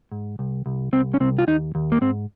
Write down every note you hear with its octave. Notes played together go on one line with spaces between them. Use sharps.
G#2
C2
C2
C2 C4
C#4
C2 C4
F4
D#2 D#4
D#2
A#3
G#2 C4